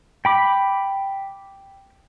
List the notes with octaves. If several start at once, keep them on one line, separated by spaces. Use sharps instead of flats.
G5 B5 D6